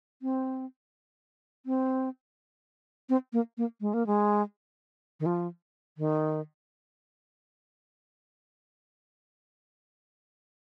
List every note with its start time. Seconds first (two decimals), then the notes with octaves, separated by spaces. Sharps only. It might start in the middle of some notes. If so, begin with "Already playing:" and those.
0.22 C4
1.66 C4
3.09 C4
3.33 A#3
3.58 A#3
3.81 G#3
3.94 A#3
4.07 G#3
5.20 D#3
5.26 F3
5.98 D#3